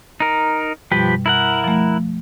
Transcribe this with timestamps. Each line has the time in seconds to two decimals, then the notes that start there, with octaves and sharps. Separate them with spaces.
0.20 D#4 A#4
0.91 F#2 B2 F3 G3 G4 B4
1.26 E4 A#4 F#5
1.64 F3 A3